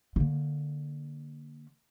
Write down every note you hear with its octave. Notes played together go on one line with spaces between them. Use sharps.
D3 A#3